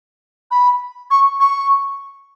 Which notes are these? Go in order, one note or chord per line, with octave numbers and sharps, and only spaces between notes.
B5
C#6
C#6